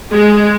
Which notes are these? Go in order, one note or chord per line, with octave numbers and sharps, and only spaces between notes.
G#3